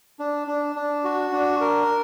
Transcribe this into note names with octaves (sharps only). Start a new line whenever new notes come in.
D4
D4
D4
F#4
D4
A#4